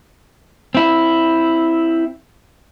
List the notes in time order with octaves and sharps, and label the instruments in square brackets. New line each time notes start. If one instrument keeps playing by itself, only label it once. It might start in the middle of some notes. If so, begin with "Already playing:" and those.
[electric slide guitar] C4 E4